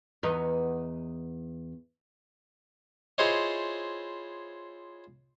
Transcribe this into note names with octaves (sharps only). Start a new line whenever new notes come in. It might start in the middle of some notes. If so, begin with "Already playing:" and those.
E2 B3 D#4
E4 F4 G#4 C5 C#5 D#5